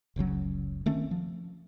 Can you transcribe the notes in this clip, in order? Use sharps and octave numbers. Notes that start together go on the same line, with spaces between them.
F#1 C#2 C#3 F#3
D#3 A3 C4 C#4
F3